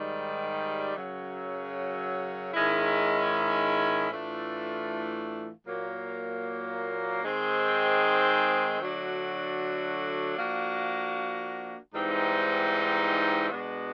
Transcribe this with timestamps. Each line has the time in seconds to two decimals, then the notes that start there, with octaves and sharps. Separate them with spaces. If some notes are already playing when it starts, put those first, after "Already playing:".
Already playing: G#2 D#3 G3
0.97 F#2 C#3 F#3
2.54 G#2 D#3 G#3 C#4 E4
4.10 A2 E3 A3 D4 F4
5.67 A#2 F#3 A#3
7.23 G#2 D#3 G#3 C4
8.80 D3 F#3 A3 D4 F#4
10.37 F3 A#3 D4 F#4
11.94 G#2 E3 G3 C4 D#4
13.50 B2 G#3 B3 D4 F#4